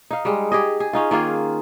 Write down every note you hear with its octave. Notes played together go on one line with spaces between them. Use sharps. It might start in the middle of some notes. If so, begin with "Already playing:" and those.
D#4 F5
G3 G#3
G4 G#4 D#5
G#4
C#4 D#4 F4
D#3 A#3 F4 G#4